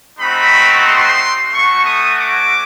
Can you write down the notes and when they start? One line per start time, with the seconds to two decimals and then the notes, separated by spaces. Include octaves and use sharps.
0.19 A3 C4 D#4 F#4 B5
0.85 C6
1.51 A3 C#4 F#4 C#6
1.84 D#6
2.17 D6